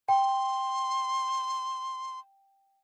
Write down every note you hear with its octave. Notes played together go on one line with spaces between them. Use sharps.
G5 C6